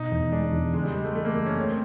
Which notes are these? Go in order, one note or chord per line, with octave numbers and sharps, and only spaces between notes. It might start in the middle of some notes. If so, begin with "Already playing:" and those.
Already playing: B2 D#4
E2
G#3 D4
E2
C#3 G#3
G3
G3 G#3
A3
E3 A3
A#3
F#2
C#4
A3 C4